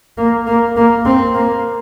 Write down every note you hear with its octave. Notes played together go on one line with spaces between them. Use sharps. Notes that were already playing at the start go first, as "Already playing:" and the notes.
A#3
A#3
A#3
C4
A#3